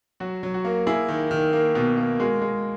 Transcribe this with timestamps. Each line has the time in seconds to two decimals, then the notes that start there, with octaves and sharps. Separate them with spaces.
0.20 F#3 F#4
0.43 F#3
0.54 F#4
0.65 A#3
0.87 A#3 E4 G#4
1.08 D#3
1.31 D#3
1.53 A#3
1.75 B2
1.97 A#3
2.19 G#3 F#4 A#4
2.41 G#3